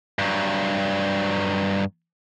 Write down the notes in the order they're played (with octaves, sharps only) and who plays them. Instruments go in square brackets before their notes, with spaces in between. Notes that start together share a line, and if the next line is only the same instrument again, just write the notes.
[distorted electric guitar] G2 F#3